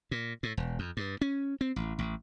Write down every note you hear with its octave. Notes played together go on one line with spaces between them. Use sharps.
A#2
A2
E1
F2
G2
C#4
C4
A1
A1